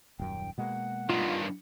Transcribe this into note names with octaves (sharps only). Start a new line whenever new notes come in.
D#1 F#2 G5
B2 G#3 A#3 F#5
G2 D#3 F4